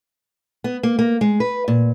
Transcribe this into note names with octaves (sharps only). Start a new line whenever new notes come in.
B3
A#3
A#3
G#3
B4
A#2